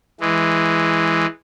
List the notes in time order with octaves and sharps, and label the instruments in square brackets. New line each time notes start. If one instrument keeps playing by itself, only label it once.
[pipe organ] E3 G#3